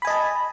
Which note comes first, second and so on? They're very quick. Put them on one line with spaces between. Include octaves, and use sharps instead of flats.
B5 G#5 D#5 A5